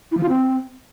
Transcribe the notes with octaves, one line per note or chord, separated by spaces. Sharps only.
E4
F3
F4
C4